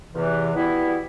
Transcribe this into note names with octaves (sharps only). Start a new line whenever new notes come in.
E2 C3 E3
B2 G3 B3 E4